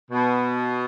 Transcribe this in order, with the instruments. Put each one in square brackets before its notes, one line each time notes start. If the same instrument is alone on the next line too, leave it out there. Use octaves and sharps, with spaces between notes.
[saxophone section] B2